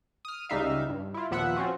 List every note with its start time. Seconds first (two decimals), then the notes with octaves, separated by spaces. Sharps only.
0.25 D#6 F6
0.49 C#2 C#3 G3 D#4 E5 F5
0.89 G2
1.14 E4 F4
1.31 D#2 A#2 F3 B3 E5 F#5
1.57 C4 C#4 F4 F#4